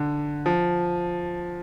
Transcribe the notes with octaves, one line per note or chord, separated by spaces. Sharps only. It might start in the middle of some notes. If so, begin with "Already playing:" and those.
Already playing: D3
F3